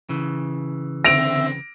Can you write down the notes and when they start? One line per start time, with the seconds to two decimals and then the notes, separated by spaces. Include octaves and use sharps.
0.09 C#3 E3
1.05 D3 C4 E5 A#6 D7 F7